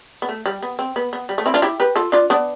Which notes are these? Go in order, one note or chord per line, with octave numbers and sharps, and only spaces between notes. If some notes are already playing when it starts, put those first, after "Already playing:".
B3
A3
G3
B3
C4
B3
B3
G3
A3
C4 E4
D4 F4
E4 G4
G4 B4
F4 A4
D4 F4
B3 D4